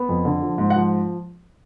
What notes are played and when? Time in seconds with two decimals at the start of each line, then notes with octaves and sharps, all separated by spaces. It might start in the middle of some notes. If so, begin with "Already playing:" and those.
Already playing: B3
0.09 F2
0.25 D3
0.42 F3
0.58 G#2
0.70 F#5
0.76 F3